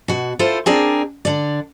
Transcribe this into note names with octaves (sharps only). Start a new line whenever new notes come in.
B2 F#4
E4 F4 A4 C5
C4 D4 G#4 A#4 D5
D3 D5